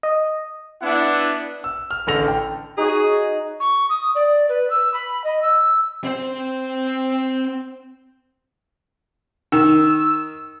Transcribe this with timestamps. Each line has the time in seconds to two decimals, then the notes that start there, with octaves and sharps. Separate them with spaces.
0.03 D#5
0.82 B3 D4 E4 F#5
1.64 E6
1.91 F6
2.07 A1 D3 A4 A#6 F7
2.28 G5
2.77 D#4 F#4 G#4 C#5
3.60 C#6
3.90 D#6
4.15 D5
4.49 B4
4.70 E6
4.94 B5
5.24 D#5
5.42 E6
6.04 C4 C5
9.52 D#3 E6